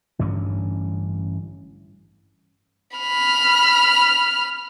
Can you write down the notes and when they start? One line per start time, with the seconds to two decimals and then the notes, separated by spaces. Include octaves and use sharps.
0.19 A1 G2 D3 C#4
2.97 B5 F6